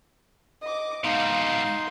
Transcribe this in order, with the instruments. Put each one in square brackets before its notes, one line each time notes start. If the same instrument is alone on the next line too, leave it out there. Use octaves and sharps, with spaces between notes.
[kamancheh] D#5 D6
[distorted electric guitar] G#2 B2 [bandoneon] D#4 C6 [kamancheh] F5